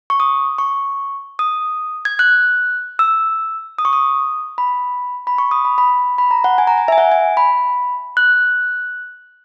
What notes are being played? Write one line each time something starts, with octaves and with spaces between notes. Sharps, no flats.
C#6
D#6
C#6
D#6
G#6
F#6
E6
D#6
C#6
D#6
B5
B5
C#6
D#6
B5
B5
B5
A#5
F#5
G#5
A#5
G#5
E5
G#5
F#5
G#5
B5
F#6